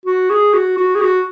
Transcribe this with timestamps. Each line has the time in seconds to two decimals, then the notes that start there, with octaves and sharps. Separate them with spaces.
0.06 F#4
0.30 G#4
0.54 F#4
0.77 F#4
0.95 G#4
1.01 F#4